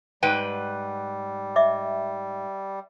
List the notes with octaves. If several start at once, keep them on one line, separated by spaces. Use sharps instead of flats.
G#2 G3 B4 G5
D#5 E5 D6